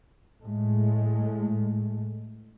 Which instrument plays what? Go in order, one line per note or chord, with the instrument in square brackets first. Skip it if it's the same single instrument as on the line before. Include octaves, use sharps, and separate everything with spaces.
[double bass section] A2 G#3 A3